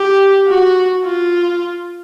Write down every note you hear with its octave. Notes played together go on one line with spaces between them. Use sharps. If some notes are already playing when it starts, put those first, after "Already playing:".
Already playing: G4
F#4
F4